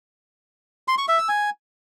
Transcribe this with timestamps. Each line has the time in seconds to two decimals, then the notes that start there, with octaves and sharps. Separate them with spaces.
0.88 C6
0.98 C#6
1.08 E5
1.18 E6
1.29 G#5